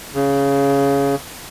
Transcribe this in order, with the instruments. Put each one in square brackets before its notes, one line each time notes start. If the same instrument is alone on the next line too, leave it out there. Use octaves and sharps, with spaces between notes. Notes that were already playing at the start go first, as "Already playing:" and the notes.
[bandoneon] C#3